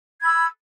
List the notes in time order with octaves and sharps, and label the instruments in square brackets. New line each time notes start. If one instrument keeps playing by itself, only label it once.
[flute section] G#6
B5
E6